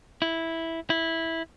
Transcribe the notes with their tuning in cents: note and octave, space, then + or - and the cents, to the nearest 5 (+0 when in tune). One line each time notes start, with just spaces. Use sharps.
E4 -5
E4 -10